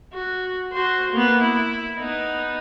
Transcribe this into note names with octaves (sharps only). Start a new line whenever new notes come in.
F#4
F#4 C5
A#3 B3
E4
B3 D#4